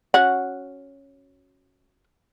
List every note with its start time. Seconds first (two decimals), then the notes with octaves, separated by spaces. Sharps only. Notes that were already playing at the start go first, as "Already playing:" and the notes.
0.14 C#4 F#4 F#5